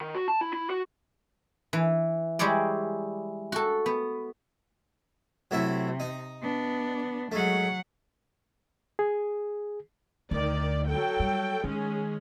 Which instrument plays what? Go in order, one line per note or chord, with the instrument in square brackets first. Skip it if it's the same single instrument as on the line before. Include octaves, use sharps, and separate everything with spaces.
[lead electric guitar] D#3
F#4
A5
E4
E4
F#4
[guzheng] E3
G3 G#3 E4 C#5 D5
F#4 A4
B3
[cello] C3 [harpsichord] F#3 A3 E4
[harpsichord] D#4
[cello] B3 D4
[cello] F#3 F#5 [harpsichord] G#3 A3
[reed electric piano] G#4
[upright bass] D2 [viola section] D#3 D5
[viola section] F#3 A4 G5
[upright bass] G3
[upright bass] D#3 [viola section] G#3 C#4 G#4